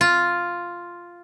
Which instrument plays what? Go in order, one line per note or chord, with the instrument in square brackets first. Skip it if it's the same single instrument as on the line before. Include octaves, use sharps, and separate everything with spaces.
[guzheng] F4